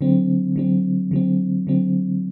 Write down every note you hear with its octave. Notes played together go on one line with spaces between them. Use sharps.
D3 F#3 C4
D3 F#3 C4
D3 F#3 C4
D3 F#3 C4